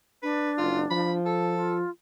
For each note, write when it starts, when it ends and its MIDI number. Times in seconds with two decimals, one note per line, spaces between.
0.23 1.18 62
0.23 0.51 71
0.58 0.89 30
0.58 0.79 65
0.91 1.83 53
0.91 1.12 83
1.26 1.75 69
1.55 1.90 65